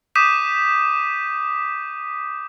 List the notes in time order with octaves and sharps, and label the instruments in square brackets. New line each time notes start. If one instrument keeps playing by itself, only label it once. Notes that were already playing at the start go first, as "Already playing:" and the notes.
[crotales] D6 D#6 G6 B6 D#7 E7